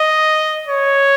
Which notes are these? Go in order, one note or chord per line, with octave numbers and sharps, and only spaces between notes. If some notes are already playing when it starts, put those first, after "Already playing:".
Already playing: D#5
C#5